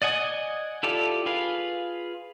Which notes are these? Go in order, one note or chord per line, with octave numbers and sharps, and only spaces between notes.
D5 D#5 F#5 G#5 D#6
E4 F4 G4 A4 D5
F4 G#4 B4 F5